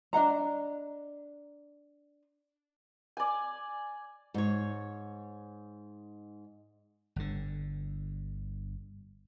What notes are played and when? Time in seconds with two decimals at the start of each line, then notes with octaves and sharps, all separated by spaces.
0.13 D4 D#5 F#5 A#5
3.17 D5 G#5
4.34 G#2 C#5
7.16 G1 D3